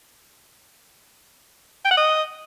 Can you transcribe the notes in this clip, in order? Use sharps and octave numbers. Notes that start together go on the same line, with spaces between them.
G5
F#5
D#5